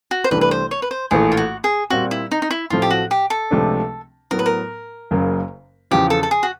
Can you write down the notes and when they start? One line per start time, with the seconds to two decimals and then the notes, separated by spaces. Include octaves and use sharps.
0.11 F#4
0.24 C5
0.31 C2 C3 E3 A3 D4 B4
0.41 B4
0.51 C5
0.71 C#5
0.82 B4
0.91 C5
1.11 A#1 A2 E3 A3 G#4
1.32 F4
1.37 F#4
1.64 G#4
1.90 A#2 G3 C4 F#4
2.11 E4
2.31 D#4
2.42 D#4
2.51 E4
2.70 A1 A2 F3 A3 C4 F4
2.82 G4
2.91 F#4
3.11 G4
3.30 A4
3.51 C#2 C3 F3 A3 D4
4.31 A2 F#3 B3 A#4
4.39 B4
4.46 A#4
5.11 F#1 F#2 C#3 F#3 A#3
5.91 E2 C#3 F3 G4
6.10 A4
6.23 A4
6.31 G#4
6.43 F#4